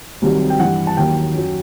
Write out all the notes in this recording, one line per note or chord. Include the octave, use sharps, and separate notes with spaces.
C2 C3 D#3 F#3
G5
G2 E3 F#5
A5
D#2 D#3 F#3 G5
F#2 F#3